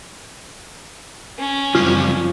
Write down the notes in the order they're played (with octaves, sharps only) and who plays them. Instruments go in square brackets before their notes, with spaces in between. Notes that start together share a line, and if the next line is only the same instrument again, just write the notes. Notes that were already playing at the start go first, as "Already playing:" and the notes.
[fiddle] C#4
[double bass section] F#2 F3 [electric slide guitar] C#3 G3 C4 [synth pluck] F4